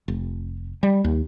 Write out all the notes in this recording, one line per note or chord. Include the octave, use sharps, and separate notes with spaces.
F1
G3
D#2